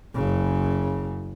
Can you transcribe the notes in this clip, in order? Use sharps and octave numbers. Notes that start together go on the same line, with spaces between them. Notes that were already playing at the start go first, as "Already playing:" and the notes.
F#1 C#3